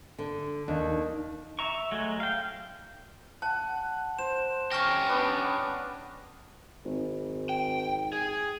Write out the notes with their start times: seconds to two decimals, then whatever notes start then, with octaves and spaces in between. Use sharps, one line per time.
0.18 D3
0.68 D#2 D4
1.59 E5 A#5 C#6
1.91 F#3 G#3 A3
2.20 F5 G5
3.42 F#5 A5
4.19 C5 E7
4.72 C#4 G4 C#6 F6 A#6
5.08 B3 D4 B4
6.85 G#1
7.49 G5
8.13 G#4